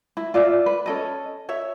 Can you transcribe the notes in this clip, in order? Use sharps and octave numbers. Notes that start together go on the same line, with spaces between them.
E4
F4 D5 E5
B4
C#4 A4 D#5
C#5 E5